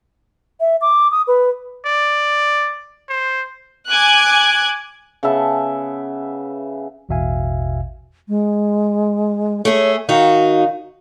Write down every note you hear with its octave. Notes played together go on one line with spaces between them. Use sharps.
E5
D6
D#6
B4
D5
C5
G#5 D6 F#6 G#6
C#3 B3 E5 A5
A1 E2 B2 E5 F5 G#5
G#3
A3 G#4 C#5
D#3 D#4 F#4 F5